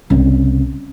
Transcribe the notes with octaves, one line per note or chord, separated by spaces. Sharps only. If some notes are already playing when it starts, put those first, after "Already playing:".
C2 C#3